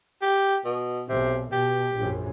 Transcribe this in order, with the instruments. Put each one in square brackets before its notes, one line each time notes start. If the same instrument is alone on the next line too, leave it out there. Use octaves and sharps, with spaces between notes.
[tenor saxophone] G4
B2
[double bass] B1 [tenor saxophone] C3
[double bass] B2 [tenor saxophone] G4
[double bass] A#1 F#2